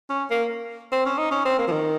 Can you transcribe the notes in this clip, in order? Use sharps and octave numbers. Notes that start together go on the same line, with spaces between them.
C#4
A#3
C4
C#4
D#4
C#4
C4
A#3
F3
D#3